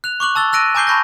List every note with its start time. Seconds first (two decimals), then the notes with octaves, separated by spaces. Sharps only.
0.04 F#6 F7
0.20 C#6 D6 F#6 F#7
0.35 A5 E6 A6 G7
0.53 E6 F#6 A#6 D7 D#7
0.75 G#5 A#5 D6 G6 C7 G7
0.87 A5 B5 C#6 G6 A#6